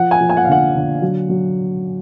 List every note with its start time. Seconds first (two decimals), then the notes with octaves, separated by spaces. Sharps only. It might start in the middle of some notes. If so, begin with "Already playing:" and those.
Already playing: F3 F#5
0.11 G#5
0.20 F3
0.29 G#5
0.37 F#5
0.45 F5
0.48 D3 F#5
0.75 D3
1.02 F#3
1.29 F#3